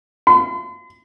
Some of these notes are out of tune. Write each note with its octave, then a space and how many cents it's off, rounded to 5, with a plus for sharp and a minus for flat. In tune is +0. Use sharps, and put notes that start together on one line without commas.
C6 -45